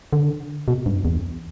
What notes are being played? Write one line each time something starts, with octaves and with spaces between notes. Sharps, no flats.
D3
B2
G2
E2